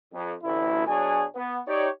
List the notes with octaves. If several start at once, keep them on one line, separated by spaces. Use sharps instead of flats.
F2
A1 D2 E4
B2 F#3 D4 G#4 C#5 G#5
B3
D#4 G4 C#5 D5